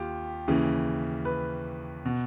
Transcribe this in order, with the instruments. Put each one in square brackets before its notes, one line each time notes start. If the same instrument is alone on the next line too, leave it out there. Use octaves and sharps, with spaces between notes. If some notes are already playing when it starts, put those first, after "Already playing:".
Already playing: [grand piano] D#2 F4 G4
D#2 C#3 E3
B4
B2